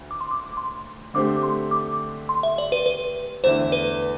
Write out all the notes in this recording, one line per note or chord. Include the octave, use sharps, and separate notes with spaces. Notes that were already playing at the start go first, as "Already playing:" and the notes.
Already playing: D2
D6
C6
D6
C6
D3 A3 C4 G4 D6
C6
D6
C6
E5
D5
B4
B4
E2 D3 A3 E4 C5
B4